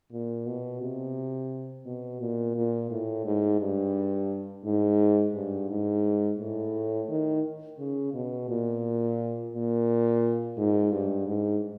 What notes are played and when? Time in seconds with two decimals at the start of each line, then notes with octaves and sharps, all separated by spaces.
0.11 A#2
0.46 B2
0.81 C3
1.85 B2
2.21 A#2
2.55 A#2
2.90 A2
3.25 G#2
3.60 G2
4.65 G#2
5.34 G2
5.70 G#2
6.39 A2
7.09 D#3
7.78 C#3
8.14 B2
8.49 A#2
9.53 A#2
10.57 G#2
10.92 G2
11.27 G#2